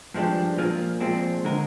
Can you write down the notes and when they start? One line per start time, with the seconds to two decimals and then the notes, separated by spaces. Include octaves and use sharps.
0.14 G2 F3 G#3 D4 G4
0.57 A#2 F3 A#3 F4 G#4
1.01 A#2 F3 G#3 C4
1.44 D3 G#3 D#4 A#4